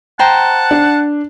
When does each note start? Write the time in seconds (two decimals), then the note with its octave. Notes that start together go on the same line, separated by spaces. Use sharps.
0.19 C5 F#5 G5 A5 A#5
0.71 D4